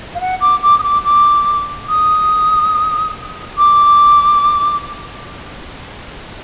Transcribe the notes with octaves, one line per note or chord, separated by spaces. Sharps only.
F5
F#5
D6
D6
D#6
D6
D6
D#6
D6